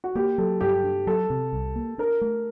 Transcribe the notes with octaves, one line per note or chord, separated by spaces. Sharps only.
F#4
A#3 G4
F#3 A4
G2 G4
D4
F#3 A4
C3
C2
A#3
D4 A#4
A3